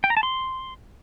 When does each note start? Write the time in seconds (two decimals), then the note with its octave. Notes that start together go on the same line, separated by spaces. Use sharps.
0.04 G5
0.10 A#5
0.17 A5
0.23 C6